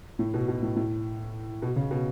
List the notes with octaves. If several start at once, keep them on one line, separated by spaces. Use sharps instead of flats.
A2
B2
B2
A2
A2
B2
C#3
B2